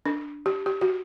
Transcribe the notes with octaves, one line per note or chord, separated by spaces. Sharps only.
D4
G4
G4
F#4